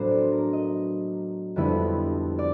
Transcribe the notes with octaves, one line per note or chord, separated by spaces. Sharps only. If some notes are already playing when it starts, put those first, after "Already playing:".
Already playing: A2 F#3 B3 D4 C5
D5
A#4
D#5
F2 D3 G3 B3 E4
D5